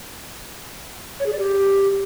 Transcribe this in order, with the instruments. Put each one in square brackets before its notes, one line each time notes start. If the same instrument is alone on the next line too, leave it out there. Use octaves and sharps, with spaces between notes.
[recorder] C#5
G#4
D5
G4